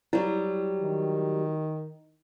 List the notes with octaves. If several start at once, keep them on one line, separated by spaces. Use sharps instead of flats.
F#3 G3 E4
D#3